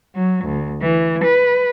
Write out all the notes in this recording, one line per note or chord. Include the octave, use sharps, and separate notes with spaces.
F#3
D2
E3
B4